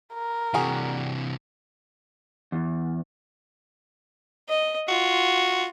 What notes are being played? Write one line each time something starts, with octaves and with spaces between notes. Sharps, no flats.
A#4
C3 E3 G3 F#4 G#4
E2
D#5
F4 F#4